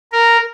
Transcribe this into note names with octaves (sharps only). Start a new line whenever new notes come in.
A#4